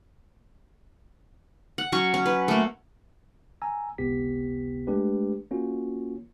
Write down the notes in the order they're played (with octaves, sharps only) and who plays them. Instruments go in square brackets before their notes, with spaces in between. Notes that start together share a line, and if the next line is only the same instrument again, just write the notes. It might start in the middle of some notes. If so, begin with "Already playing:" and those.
[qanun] F#5
F#3 C#4 F#4 C#6
C#4
B4
A3 A#3
[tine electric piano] G#5 A#5 E6
G1 C#2 C3 B3 G4 B6
G#3 A3 D4 G4 B4
A#3 C#4 F4 F#4